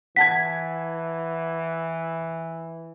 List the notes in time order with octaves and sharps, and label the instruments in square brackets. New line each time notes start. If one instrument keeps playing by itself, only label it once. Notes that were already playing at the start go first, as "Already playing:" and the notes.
[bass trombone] E3 [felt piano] F#5 A5 G#6 [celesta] B6